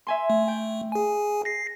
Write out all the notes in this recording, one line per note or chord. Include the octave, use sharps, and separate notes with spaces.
E5 G#5 C6
A3
G5
G#4 G#5
A#6 C7